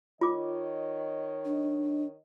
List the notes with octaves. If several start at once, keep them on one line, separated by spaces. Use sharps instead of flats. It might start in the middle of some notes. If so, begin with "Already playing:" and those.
D#3 F4 C#5 D#5 D6
D4